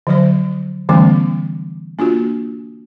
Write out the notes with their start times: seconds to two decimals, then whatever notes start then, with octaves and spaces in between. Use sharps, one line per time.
0.07 D3 F3 F#3 C5
0.89 D3 E3 G3 A3 B3 C#4
1.99 A#3 D4 F4 F#4